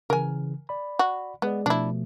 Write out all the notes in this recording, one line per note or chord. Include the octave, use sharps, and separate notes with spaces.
C#3 E3 A#4 G#5
D5 B5
F#4
G#3 B3 G#4 D5
B2 F3 A3 D4 E4